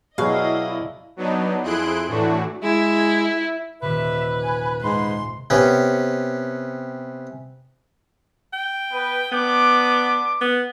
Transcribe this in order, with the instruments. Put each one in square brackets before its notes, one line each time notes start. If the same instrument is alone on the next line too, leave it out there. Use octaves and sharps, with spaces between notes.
[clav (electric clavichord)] B2 F#3 [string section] E4 D5 D#5 [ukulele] G#4 [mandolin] F5
[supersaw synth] F#3 B3 D4 D#4
F2 E4 G#4 C6 F#6 D7
A2 E3 A3 D4 F#4
[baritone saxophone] G#3 [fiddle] E4
[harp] D#1 C3 [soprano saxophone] B4 [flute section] E5
[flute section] G#5
[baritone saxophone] G#2 [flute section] C6
[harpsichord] C3 B3 C#4 G4
[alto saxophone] G5
[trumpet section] B3 B4
[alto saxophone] B3 [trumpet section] D4 B4 D6
[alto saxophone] B3